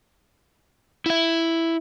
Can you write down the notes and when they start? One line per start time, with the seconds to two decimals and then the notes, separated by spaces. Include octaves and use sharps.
1.06 E4 E5